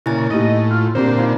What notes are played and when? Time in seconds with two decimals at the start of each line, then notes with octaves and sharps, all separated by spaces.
0.06 A#2 C#3 E4 G#5 A6
0.30 A2 A#3 D#4 G4 D#5
0.71 F4
0.95 A#2 D3 C4 D4 G4 C5
1.18 D#4 F4 F5